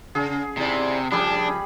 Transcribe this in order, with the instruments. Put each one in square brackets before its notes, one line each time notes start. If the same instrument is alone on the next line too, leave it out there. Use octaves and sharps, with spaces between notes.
[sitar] C#3 [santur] G#4
[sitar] G#2 E4 D5 [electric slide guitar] C3
[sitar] C#3 F3 A3 [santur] G3 G#4 B5 [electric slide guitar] D4